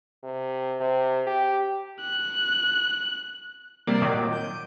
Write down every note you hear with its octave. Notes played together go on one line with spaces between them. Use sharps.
C3
C3
G4
F#6
C3 G3 A#3 D5 C7
A#2 D#3 F#3 D6
G6 D7 D#7